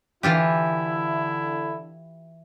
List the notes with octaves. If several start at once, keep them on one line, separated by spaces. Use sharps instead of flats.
D3 E3 E4 F4 G4